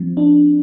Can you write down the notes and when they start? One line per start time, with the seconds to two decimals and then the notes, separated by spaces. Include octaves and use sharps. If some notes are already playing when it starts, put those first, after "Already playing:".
Already playing: F3 C4
0.17 D4